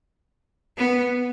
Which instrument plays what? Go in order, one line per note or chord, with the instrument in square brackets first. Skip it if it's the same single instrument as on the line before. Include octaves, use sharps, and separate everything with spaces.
[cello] B3